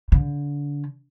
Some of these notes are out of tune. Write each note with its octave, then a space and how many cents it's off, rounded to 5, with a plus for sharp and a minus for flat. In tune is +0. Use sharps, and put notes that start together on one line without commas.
D3 -30